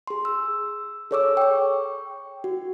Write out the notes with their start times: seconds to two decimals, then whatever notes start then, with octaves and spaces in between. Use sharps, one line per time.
0.07 G#4 C6
0.25 E6
1.11 G#4 A4 C#5 C#6 D6 E6
1.37 G5 C#6
2.44 F#4